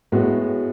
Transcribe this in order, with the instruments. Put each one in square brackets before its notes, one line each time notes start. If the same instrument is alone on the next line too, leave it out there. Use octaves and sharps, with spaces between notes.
[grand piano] A2 G#3 B3 F#4